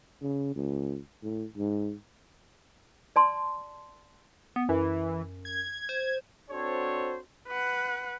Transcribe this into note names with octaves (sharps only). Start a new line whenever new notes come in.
C#3
C#2
A2
G#2
D5 A5 C6
B3
F#2 E3
G#6
C5
C4 D4 F#4 A4 C5 C#5
B4 F#5